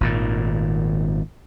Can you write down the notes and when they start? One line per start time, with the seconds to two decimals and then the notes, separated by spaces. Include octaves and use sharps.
0.01 G#1 A#2 D#3